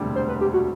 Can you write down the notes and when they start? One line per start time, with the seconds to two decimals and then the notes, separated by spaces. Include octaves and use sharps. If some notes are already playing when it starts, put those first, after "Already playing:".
Already playing: E1 D2 C3 G3 D4
0.16 C5
0.29 B4
0.41 G4
0.54 F#4